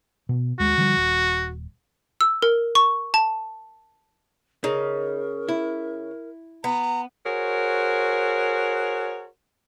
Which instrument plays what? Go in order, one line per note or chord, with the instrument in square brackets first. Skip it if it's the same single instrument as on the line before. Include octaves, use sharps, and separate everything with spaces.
[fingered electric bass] B2
[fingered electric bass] D#2 G#3 [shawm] F#4
[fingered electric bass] D3 F3 G3
D#1
[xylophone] E6
A#4
C#6
A5
[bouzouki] C#3 [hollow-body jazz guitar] D#4 [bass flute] A#4
[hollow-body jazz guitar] E4
[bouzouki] B3 [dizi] A#5
[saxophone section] F#4 G#4 A#4 C5 C#5